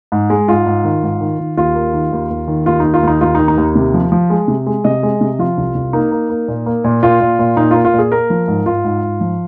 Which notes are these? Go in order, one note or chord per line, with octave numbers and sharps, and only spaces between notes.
G#2
G#3
G#2 F4
G#2
D#3
G#2
D#3
D#3
D#2 F4
A#3
D#3
D#2
D#2
D#3
D#2 F4
D#3 D#4
F4
D#2 D#4
D#2 F4
D#4
D#3
D#4
D#2
C3
F3
F3
G#3
C3
G#3
C3 D#5
G#3
C3
F3 F4
C2
C2
A#3 D#4
A#3
A#3
A#2
A#3
A#2
A#2 F4
A#2
A#2
A#2 D#4
A#3 F4
F4
A#2 G#4
A#3 A#4
F3
G#2
G#2 F4
G#2
G#2
F3